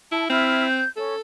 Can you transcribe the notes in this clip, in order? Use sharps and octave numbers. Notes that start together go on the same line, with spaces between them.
E4 A5
C4 E4 F6
G6
C#4 A4